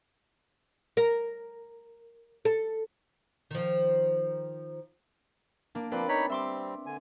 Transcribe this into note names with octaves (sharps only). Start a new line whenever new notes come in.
A#4
A4
D#3 F3
A#3 D4
F3 A#3 C4 B4 D5
D#4 C#5 B5
G3 C4 E5 C6 D6
D3 G#5